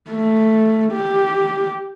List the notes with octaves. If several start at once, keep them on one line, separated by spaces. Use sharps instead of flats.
A3
G4